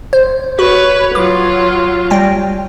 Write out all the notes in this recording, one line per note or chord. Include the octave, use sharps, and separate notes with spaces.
C5
F#4 B4 C#5
F#3 F4 D6
G3 G5 A#6